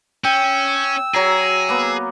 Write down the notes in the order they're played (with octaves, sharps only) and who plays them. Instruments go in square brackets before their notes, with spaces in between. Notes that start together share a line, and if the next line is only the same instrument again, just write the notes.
[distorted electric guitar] C#4 [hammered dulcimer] G5 [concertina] E6
[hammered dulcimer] F#3 A#5 [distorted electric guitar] G#4
[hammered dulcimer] A#3 B3